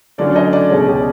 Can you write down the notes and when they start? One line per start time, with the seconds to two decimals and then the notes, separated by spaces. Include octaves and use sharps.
0.18 D3 F#3 A3 C#4 D5
0.36 D#5
0.53 D5
0.69 C#2 B2 G#3 C#4 C#5
0.86 G4